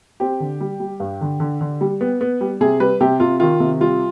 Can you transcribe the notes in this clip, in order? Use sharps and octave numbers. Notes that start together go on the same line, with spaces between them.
C4 G4
D3
G3
G3
G2
D3
D3
D3
G3
B3
B3
G3
C3 G#4
G3 B4
C3 G4
C3 F4
D#3 F4
C3
G3 F4